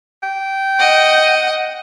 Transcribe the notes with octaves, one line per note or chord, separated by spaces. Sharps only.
G5
D#5 F#5